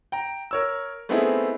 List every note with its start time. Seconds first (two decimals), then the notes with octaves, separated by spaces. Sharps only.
0.12 G5 A#5
0.51 A#4 C#5 E6
1.09 A3 B3 C4 D#4 E4 G#4